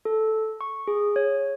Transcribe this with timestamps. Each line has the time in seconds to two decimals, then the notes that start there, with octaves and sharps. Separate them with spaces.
0.05 A4
0.61 C#6
0.88 G#4
1.16 C#5